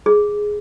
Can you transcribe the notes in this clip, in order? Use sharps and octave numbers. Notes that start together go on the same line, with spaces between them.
G#4